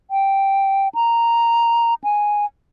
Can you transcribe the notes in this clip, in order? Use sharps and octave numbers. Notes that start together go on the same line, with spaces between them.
G5
A#5
G#5